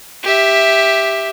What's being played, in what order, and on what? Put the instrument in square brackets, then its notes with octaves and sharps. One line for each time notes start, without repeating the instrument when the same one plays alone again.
[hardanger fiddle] G4 E5